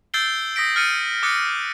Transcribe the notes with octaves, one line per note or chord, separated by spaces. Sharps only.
E6 G6 A6 C7 D7 G7
D#6 A#6 B6 D7
F6 A6 C#7 D#7
D6 D#6 F#6 A6 C#7